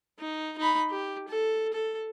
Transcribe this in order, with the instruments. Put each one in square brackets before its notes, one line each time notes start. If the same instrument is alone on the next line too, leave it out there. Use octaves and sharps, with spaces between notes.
[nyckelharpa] D#4
D#4 B5
G4
A4
A4